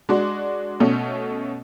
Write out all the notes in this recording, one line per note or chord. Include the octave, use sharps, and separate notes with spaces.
G#3 D4 F#4
B2 A3 C#4